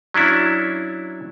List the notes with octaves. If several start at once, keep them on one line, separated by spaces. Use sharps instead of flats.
F#3 C#4 D4 E4